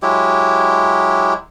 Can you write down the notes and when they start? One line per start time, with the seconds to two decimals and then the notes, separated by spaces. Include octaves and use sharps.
0.02 F#3 G#3 E4 G4